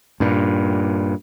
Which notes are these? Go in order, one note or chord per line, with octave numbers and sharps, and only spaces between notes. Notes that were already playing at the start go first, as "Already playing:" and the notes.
G2 A#2